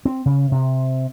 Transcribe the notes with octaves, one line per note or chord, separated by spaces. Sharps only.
C4
C#3
C3